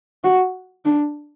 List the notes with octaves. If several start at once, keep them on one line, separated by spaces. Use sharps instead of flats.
F#4
D4